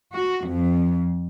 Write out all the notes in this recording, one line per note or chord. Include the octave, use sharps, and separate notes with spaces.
F#4
F2